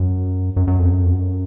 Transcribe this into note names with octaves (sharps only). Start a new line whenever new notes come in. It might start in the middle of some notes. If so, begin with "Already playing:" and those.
Already playing: F#2
F#2
F#2
F2
F#2
F2
F#2